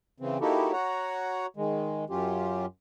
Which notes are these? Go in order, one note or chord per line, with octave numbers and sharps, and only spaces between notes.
C#3 E3 C4
A#3 D#4 E4 F#4 G4 A4
F#4 C#5 F#5 A#5
D#3 G#3
F#2 F#3 C#4 F4 G4